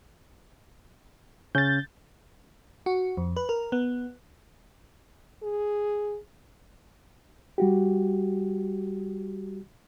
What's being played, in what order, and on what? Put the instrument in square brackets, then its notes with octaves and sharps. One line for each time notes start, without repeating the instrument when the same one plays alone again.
[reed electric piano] C#3 C#4 [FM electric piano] G6 A6
[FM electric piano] F#4
F2
B4
A#4
B3
[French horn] G#4
[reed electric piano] G3 F#4 G4